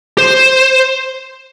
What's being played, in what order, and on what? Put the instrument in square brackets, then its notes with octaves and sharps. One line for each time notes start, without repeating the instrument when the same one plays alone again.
[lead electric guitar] C5